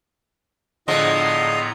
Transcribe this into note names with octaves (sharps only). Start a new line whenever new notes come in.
A2 D3 F3 G#3 B3 D#5 A#5 C6